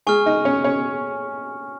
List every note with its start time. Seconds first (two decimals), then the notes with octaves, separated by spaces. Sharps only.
0.07 G#3 G#4 G#5 C#6 F6
0.26 D#4 D#5
0.45 C#4 C#5
0.64 C#4 C#5